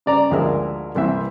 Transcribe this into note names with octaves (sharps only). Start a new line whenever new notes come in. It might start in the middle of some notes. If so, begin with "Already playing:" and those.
C#3 D5 A#5
G#1 D2 F3 G#4 A#4 E5
C2 E3 C4 E5